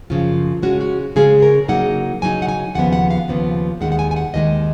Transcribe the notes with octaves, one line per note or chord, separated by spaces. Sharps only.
F#2 C#3 F3 F4
C#3 G#3 C#4 F#4
F#4
C#3 G#3 C#4 G#4
A#4
C#3 F#3 A#3 D#4 F#5
C#3 F#3 A#3 D#4 G#5
F#5
G#5
D#2 C#3 F3 B3 F#5
F#5
F5
D#2 C#3 F3 B3
D#2 D#3 G#3 F#5
F#5
G#5
G#5
F#5
D#2 D#3 G#3 D#5